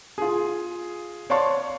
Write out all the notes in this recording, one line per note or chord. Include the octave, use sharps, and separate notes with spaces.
F4 G#4
C#5 D5 F5 A5 C6 C#6